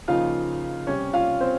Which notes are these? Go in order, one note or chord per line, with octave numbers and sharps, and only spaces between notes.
C#3 F3 A#3 D#4 F4 F5
C3 G3 C#4 C#5
F4 F5
C4 C5